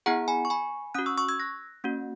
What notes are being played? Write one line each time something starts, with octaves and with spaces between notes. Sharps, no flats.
B3 E4 G#4 F#5 A#5
G#5 B5
C#6
G#5 B5
C#4 F#4 D#6 F#6
C#6 E6
C#6 E6
E6 G#6
F#6 A#6
A#3 C#4 F#4